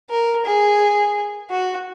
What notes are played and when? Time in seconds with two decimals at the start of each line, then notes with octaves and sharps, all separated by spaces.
0.10 A#4
0.45 G#4
1.50 F#4